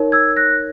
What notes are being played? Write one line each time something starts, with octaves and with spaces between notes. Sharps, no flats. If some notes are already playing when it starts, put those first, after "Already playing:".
Already playing: D#4 A#4 C#5
E6 G#6
F#6 A#6